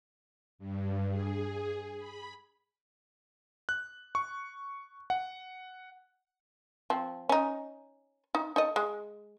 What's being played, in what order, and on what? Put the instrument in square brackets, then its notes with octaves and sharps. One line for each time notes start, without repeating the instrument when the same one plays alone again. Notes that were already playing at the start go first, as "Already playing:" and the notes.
[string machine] G2
G#4
B5
[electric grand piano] F#6
C#6
F#5
[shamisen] F3 C4
C#4 D#4
D#4
D#4 A4 D#5
G#3